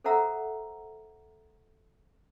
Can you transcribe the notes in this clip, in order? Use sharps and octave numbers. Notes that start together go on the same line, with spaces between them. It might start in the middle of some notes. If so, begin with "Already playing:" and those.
A4 C5 E5 F#5 A#5 E6